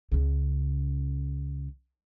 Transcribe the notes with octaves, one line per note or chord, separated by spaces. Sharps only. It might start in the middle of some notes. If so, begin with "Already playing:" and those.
C#2 C#3